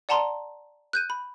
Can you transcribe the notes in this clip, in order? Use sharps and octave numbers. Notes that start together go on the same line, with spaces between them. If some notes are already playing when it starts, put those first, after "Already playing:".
D5 F#5 A5 A#5 C6
F#6 G6 D#7
B5